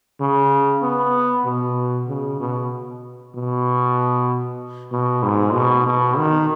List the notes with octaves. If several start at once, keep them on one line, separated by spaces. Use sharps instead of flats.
C#3
B3
B2
C#3
B2
B2
B2
G#2
B2
B2
D#3